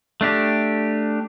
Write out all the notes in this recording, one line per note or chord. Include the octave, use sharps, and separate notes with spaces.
A3 D4 G4